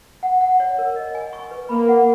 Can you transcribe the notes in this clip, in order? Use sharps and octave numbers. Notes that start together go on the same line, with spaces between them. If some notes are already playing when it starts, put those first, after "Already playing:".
F#5
F#5
C#5
A#4
D#5
G#5
C#6
B4
A#3 B5
F#5